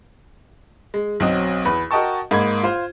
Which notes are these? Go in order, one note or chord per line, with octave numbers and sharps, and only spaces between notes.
G#3
B1 F#3 C4 D#5
E2 B4 B5
F#4 A#4 D#5 G5 A5 C#6
G#2 A#3 D#4 B5 G#6
F4 C5